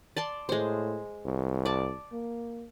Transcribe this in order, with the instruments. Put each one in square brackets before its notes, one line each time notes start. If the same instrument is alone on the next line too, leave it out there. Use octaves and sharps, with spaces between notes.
[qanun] D5 A5 C6
[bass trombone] A2 [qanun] G#3 C5
[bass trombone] C2
[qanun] D5 A5
[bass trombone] A#3